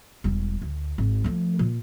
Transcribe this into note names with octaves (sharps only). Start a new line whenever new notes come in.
E1 G3
D2
G#1
F3 A3
A#2